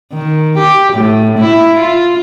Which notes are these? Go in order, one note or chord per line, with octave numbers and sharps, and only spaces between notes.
D#3
G4
A2
E4
F4